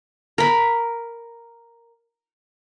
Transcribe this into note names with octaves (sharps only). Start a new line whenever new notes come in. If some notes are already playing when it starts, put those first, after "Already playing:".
A#4 B5